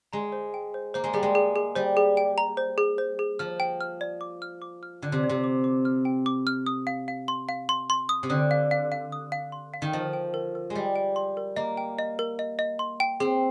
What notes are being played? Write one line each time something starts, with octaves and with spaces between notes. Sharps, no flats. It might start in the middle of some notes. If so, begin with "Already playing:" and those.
G#3 A#5
C5
G5
C5
A#3 C5
G#3
G3 G#4
G#3
G#4
G#4
G3 C5
G#4
G5
A#5
C5
G#4
C5
G#4
F3 F6
G5
F6
D5
D6
F6
D6
F6
D3 D5
C3
D5
C3
D6
D6
F6
G5
D6
F6
D#6
F5
F5
C6
F5
C6
C6
D#6
C3
D3 D#6
F5
F5
F5
D#6
F5
C6
F5
D#3
F3 D#5
G5
A#4
A#4
G#3
G3 D#5
G5
C6
A#4
A#3 D#5
G5
D#5
A#4
D#5
D#5
C6
G5
C4 G#4